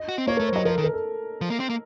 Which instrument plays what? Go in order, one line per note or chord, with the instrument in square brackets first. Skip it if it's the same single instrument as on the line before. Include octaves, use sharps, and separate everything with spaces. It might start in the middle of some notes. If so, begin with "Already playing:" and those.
Already playing: [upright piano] D#5
[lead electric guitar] F#4
C4
[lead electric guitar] A#3 [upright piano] C#5
[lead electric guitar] A3 [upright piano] A#4
[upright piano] C5
[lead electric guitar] F#3 [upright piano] D#5
[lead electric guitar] F3 [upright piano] A#4
[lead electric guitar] D#3 [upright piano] A4
[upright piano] A#4
A4
[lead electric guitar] F3
A#3
C4
A#3